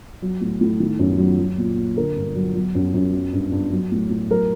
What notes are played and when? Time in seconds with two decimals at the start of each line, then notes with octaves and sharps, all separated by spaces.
0.22 F#3
0.41 A2
0.61 A2
0.80 D#3
0.99 F#2
1.18 F#3
1.39 F#3
1.58 A#2
1.77 A#2
1.97 D3 A#4
2.17 G2
2.35 F#3
2.55 F#3
2.75 F#2
2.94 F#2
3.13 F#3
3.33 G2
3.52 G2
3.71 F#3
3.92 A2
4.10 A2
4.30 F#3 A#4